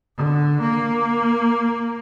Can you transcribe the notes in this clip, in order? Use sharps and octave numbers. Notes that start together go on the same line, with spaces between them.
D3
A#3